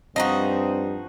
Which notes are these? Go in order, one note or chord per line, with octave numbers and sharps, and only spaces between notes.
G2 F3 C4 D#4 F#4 D#5